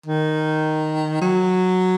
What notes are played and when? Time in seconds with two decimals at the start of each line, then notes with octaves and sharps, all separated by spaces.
0.06 D#3
1.22 F#3